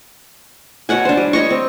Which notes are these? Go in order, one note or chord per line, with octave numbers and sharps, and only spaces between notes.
B2 C#5 F#5 G#5
D4 C5
G3
C#5 D#5 C#6
C4